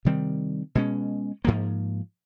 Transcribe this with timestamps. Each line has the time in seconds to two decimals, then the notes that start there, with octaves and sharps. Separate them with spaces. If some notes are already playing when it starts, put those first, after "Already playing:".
0.05 C3 D#3 G3 C4
0.75 B2 G#3 C#4
1.45 G#2 F3 A#3